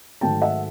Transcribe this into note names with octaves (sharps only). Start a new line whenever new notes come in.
G#2 D#3 F#3 A3 G5 A5
E5 F#5